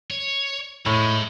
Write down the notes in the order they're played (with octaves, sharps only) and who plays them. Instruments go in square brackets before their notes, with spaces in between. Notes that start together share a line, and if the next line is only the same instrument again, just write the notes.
[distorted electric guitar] C#5
[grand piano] A2 [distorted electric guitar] G#3 D#4